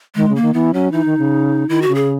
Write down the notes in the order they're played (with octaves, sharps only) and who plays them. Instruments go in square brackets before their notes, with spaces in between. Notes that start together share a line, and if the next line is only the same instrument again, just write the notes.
[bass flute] D#3 [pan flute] G#3
[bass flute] C#3
[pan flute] A#3
[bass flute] D#3
[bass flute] E3 [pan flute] B3
[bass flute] F#3 [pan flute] C#4
[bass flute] E3 [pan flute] D#4
[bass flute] D#3
C#3
[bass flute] D#3 [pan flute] E4
[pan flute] F#4
[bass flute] C#3
[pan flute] G#4